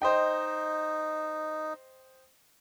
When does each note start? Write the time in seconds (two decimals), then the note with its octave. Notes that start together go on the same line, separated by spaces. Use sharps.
0.02 D#4 C5 D#5 G5